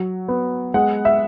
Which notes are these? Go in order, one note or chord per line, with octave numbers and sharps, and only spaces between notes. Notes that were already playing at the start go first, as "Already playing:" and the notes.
Already playing: F#3
B3
G#3 F#5
E5